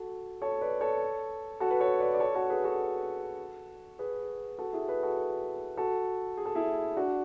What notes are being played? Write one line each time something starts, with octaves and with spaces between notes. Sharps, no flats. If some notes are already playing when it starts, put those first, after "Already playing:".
Already playing: F#4 A4
A4 C#5
B4 D5
A4 C#5
F#4 A4
B4
A4 C#5
B4 D5
D5
A4 C#5
F#4 A4
G#4 B4
F#4 A4
G#4 B4
F#4 A4
E4 G#4
G#4 B4
F#4 A4
F#4 A4
G#4
A4
E4 G#4
D4 F#4